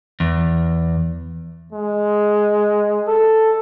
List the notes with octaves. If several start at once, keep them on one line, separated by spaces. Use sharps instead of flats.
E2
G#3
A4